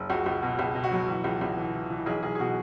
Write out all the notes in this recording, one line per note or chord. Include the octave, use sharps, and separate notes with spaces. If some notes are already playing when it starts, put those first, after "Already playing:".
Already playing: F#1
C#2 F#4
C#2
B2
C#2
B2
F#4
F#3
E3
C#2
C#2
E3
E3
E3
B1 G#4
B1 G#4
G#4
B2 F#4